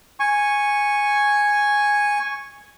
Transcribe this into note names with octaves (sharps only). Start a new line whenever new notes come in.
G#5 C#6